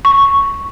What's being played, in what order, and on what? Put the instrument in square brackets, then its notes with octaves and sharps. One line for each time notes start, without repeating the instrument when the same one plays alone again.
[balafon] C#6